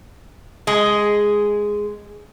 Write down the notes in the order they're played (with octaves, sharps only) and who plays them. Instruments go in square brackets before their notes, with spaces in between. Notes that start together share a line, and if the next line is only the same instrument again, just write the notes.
[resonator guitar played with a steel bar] G#3 G#4